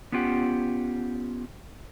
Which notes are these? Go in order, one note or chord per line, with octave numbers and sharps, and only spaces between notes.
B3 C#4 F4 G4 F#5